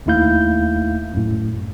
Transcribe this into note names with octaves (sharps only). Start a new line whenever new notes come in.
D#2 A3 D#4 E4 F5 G6
F#2 A2